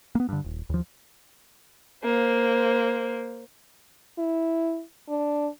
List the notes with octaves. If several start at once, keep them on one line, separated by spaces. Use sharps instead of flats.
A#3 B3
G2 D3
D#1
D#2 F3
A#3 C5
E4
D4